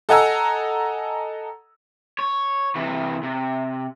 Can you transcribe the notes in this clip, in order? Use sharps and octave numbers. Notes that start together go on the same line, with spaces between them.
A4 D#5 F#5 G#5 A#5 E6
C#5
C3 E3
C3